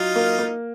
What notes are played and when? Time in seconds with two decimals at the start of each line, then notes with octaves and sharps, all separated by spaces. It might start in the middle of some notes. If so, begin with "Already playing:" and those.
Already playing: F#3 D#4 F4
0.16 A#3
0.39 A#3